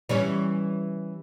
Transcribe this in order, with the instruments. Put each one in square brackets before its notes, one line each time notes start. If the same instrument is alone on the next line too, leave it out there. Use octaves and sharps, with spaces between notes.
[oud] E3 G3 C#4